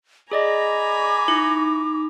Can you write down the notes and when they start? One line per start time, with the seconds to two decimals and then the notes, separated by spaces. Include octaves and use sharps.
0.31 G#4 D5 D#5 G#5 A#5 B5 D6
1.28 D#4 E4